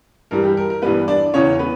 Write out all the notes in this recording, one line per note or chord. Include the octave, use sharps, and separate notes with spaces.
G2 E3 G3 A#4
G4
A#4
A#4
G2 E3 G3 B3 B4
D4 D5
E2 C#3 E3 C#4 C#5
B3 B4